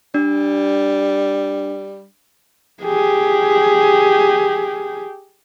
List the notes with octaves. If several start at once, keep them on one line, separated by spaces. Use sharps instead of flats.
G3 D4
G4 G#4